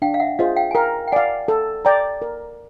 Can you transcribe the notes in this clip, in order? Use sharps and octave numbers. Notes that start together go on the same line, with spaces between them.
D4 F5 G5
F5
E5 F#5
F4 G#4 C5 D#5 F5
F5 G5
G#5
A#4 F5 G5
G5
D5 F5 F#5 G#5
A4
D5 G5 A#5
A#4